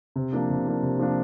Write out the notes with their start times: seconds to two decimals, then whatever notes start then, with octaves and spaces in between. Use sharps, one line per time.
0.16 C3
0.32 F3 A#3 D4
0.50 C3
0.66 F3 A#3 D4
0.82 C3
0.99 F3 A#3 D4